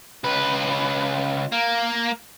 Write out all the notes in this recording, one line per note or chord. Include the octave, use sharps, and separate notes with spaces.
C#2 B4
A#3